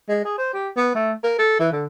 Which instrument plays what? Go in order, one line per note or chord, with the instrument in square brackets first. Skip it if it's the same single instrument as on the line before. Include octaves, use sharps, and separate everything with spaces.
[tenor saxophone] G#3
G#4
C5
G4
B3
A3
A#4
A4
E3
D3